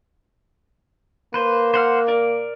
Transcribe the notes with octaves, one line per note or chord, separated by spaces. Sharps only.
A#3 B4 C5
C5 F#5 F6
A#4 D5